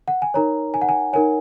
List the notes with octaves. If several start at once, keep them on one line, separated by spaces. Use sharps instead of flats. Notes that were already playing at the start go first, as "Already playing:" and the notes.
F#5
G#5
D#4 A#4 C#5 A#5
G#5
F#5
G#5
D#4 A#4 C#5 G#5